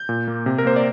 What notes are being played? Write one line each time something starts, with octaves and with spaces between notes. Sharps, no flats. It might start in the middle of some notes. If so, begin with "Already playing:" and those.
Already playing: G6
A#2
A#3
C3
A#4
A#3 C5
D5